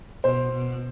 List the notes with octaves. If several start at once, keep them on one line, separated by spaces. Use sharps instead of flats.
B2 C5
B2